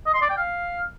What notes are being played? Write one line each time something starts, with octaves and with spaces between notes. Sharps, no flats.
D#5
C6
D5
G5
F5